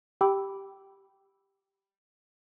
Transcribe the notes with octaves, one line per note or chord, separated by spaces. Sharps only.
G4 G5 B5 D6 E6